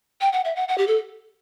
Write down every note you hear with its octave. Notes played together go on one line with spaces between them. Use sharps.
G5
F#5
E5
F#5
F#5
G4
A4